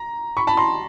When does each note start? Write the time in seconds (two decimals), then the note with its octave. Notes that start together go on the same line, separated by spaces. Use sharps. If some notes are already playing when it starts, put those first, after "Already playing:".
Already playing: A#5
0.37 B5 C#6
0.47 A5 B5
0.57 A#5 C6